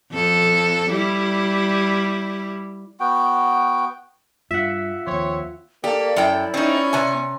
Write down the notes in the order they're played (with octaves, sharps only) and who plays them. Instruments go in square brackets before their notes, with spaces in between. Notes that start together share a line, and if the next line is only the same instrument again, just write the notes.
[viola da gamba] F2 A4
G3 E4
[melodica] B3 F#4 G5
[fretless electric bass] G2 [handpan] F4 [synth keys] E5 F#5
[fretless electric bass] D#2 F3 [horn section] C4 C5 C#5
[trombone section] A#3 [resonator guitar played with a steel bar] G4 [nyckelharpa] A4 [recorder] D5
[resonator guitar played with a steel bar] F#2 G5 [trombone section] E4
[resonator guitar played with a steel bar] C4 D#4 [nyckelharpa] C#4 C#6
[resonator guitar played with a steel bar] C3 G#5